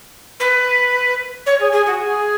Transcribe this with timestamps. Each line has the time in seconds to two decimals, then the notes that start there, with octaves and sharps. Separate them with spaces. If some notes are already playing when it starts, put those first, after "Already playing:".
0.40 B4
1.46 C#5
1.60 G#4
1.72 G#4
1.87 F#4
2.00 G#4